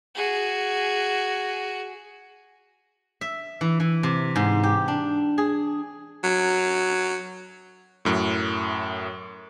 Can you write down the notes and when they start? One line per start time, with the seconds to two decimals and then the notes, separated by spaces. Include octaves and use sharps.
0.15 F#4 G#4
3.21 E5
3.61 E3
3.80 E3
4.03 C3
4.36 G#2
4.64 G4
4.88 D4
5.38 G#4
6.24 F#3
8.05 F#2 A2